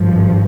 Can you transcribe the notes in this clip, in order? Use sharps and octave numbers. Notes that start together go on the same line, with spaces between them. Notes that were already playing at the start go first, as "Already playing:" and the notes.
Already playing: G#1 G2 F3